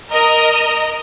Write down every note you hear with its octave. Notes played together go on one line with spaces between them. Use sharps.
A#4 D#5